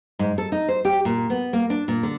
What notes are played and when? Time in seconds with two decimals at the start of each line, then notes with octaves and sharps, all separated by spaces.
0.19 G#2
0.38 A4
0.52 D#4
0.68 C5
0.85 G4
1.05 A#2
1.30 B3
1.53 A#3
1.70 D4
1.88 A#2
2.03 D3